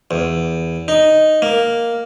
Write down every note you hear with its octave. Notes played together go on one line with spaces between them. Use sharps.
E2
D#4
A#3